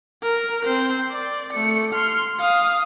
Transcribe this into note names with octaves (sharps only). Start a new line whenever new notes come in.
A#4
C4 C5
D5
A3 C#7
C6 F6
F5 D#6